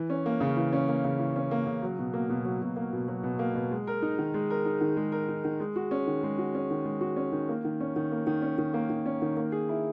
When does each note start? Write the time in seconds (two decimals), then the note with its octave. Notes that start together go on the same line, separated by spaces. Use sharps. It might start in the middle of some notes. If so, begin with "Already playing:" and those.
Already playing: E3
0.10 C#4
0.26 A#3
0.40 C#3
0.56 E3
0.73 C#4
0.89 A#3
1.04 C#3
1.19 E3
1.36 C#4
1.51 A#3
1.66 C#3
1.82 F#3
1.99 B2
2.13 A#3
2.30 B2
2.45 F#3
2.62 B2
2.76 A#3
2.93 B2
3.08 F#3
3.23 B2
3.39 A#3
3.55 B2
3.71 G#3
3.87 A#4
4.02 D#4
4.18 D#3
4.34 G#3
4.50 A#4
4.65 D#4
4.81 D#3
4.96 G#3
5.12 A#4
5.29 D#4
5.44 D#3
5.60 G#3
5.76 F#4
5.91 C#4
6.07 D#3
6.23 G#3
6.38 F#4
6.55 C#4
6.70 D#3
6.85 G#3
7.01 F#4
7.17 C#4
7.32 D#3
7.49 A#3
7.65 D#3
7.80 C#4
7.96 D#3
8.12 A#3
8.27 D#3
8.42 C#4
8.58 D#3
8.74 A#3
8.90 D#3
9.06 C#4
9.22 D#3
9.37 A#3
9.52 G#4
9.69 E4